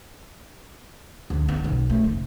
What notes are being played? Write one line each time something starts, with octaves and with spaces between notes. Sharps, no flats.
D2
B3
B1
A3
F1